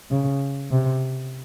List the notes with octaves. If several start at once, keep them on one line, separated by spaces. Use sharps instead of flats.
C#3
C3